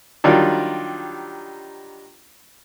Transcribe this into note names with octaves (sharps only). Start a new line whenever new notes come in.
D#3 F#3 G3 D4 F4